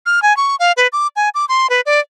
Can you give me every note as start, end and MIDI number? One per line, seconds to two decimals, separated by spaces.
0.06 0.22 89
0.22 0.35 80
0.37 0.56 85
0.59 0.72 77
0.77 0.87 71
0.93 1.07 86
1.16 1.29 80
1.34 1.45 86
1.49 1.69 84
1.70 1.81 71
1.86 2.00 74